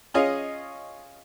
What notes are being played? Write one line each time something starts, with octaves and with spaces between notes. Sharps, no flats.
C#4 F4 G#4 C#5 D#5 F5